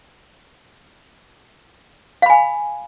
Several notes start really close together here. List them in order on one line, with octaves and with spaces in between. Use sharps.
F5 B5 G#5